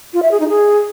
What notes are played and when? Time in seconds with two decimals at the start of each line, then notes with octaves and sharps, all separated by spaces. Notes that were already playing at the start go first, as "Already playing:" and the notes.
0.14 F4
0.23 E5
0.31 G#4
0.40 D#4
0.49 G#4